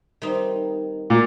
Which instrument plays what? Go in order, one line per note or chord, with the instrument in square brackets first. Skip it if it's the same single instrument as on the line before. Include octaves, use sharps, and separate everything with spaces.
[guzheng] D#3 G3 C4 D#4
[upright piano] A#2